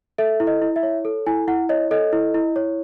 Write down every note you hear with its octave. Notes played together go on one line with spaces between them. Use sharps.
A4 E5
E4
D#5
E4
E5
C#5
A4
E4 G#5
E4 F#5
C#5 D#5
A4 D#5
E4
E4
C#5